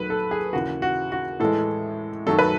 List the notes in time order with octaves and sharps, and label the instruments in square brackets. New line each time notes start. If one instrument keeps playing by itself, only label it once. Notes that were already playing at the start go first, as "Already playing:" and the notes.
Already playing: [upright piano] D#2 D#3 F#3 A3 B4
A4
G#4
D#2 C#3 E3 F#4
F#4
F#4
A2 E3 G#3 A4
F#2 D#3 F#3 A3 A4
B4